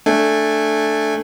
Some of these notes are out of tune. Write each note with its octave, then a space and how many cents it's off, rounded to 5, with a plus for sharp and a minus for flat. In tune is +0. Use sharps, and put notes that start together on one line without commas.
A3 +0 D4 +0 G#5 -15